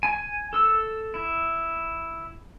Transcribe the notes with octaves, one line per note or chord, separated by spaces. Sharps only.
G#5
A4 E6
E4